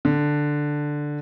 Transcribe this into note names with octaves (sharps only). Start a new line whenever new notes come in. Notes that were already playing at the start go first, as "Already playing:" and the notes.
D3